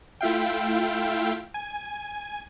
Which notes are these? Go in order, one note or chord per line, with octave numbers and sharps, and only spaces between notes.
A3 E4 F4 E5 F5 G5
G#5